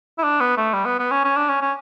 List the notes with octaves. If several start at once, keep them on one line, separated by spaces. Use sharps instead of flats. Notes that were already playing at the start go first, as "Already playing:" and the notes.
E4
D4
B3
A3
G3
B3
B3
C#4
C#4
D4
C#4
C#4